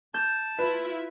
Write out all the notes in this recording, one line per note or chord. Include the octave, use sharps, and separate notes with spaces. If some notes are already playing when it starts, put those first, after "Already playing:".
A5 G6
E4 F4 B4 E5